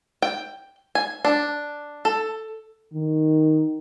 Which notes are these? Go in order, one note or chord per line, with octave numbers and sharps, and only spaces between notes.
G5
G#5
D4
A4
D#3